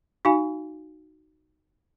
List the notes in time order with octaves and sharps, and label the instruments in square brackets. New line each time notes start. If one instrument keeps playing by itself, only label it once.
[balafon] D#4 F#4 F5 G#5